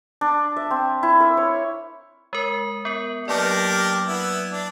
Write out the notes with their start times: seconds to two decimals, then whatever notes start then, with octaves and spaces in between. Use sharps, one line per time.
0.21 D4
0.56 E5
0.71 C4
1.03 E4
1.20 A#4
1.37 C#5
2.33 G#3 A#4
2.85 B3 A#4
3.28 F#3 A#3 D4 G4 A#4 D5
4.07 B3 E4
4.52 D4